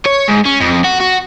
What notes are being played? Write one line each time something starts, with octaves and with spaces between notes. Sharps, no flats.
C#5
G#2
C#4
F2
F#4
F#4